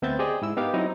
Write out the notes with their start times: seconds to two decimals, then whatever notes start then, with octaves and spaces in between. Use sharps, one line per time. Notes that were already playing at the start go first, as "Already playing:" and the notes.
0.02 D2 B3 C4 E5 G6 A6
0.19 G4 G#4 C5 D5 D#5 G5
0.42 G#2 E4 E6
0.57 B3 D#4 G4 A#4 F5
0.74 F#3 C4 D#4 E4